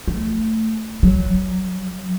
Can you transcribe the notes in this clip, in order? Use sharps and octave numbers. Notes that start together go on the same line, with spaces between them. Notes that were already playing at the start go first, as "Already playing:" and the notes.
A3
F#3